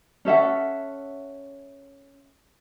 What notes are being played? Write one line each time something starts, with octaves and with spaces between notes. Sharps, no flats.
C#4 A4 E5 F#5